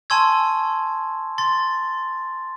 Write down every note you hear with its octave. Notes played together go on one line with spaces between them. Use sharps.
G#5 A5 C6 C#6 E6 G#6
C6 A6